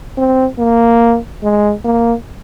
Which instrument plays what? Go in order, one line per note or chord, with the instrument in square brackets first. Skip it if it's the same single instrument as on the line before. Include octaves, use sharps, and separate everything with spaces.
[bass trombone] C4
A#3
G#3
A#3